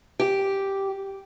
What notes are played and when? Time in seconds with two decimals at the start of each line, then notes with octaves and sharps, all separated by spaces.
0.20 G4